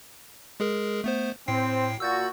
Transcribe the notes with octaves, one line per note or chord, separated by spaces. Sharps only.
G#3 G#4 A#4
A3 B3 C5
A2 C4 G5 C7
A#2 F#4 E6 G6 A6